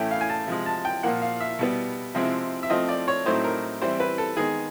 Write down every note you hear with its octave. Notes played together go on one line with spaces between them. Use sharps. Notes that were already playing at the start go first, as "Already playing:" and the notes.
Already playing: A2 E3 A3 C#4 E4 G5
F5
G#5
A5
C3 F3 G#3
A5
G5
A#2 F3 A#3 F#5
F5
E5
B2 G3 B3
C3 F3 G#3 C4 E4
E5
F3 A3 C4 F4 D#5
D5
C#5
A2 F#3 A3 C4 D#4 C5
A#4
E3 G3 C4 E4 C5
B4
A4
D#3 G#3 B3 D#4 G#4